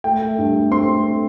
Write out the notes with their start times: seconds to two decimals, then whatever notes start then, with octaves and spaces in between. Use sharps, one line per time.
0.04 A3 G5
0.21 A3
0.38 G2
0.54 A3
0.71 C4 C6
0.88 A3